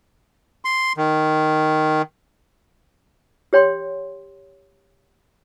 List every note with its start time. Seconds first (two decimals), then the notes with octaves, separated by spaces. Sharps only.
0.65 C6
0.97 D#3
3.53 G4 C#5 G5 C6